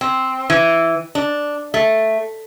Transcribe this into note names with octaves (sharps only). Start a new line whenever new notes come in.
C4
E3
D4
A3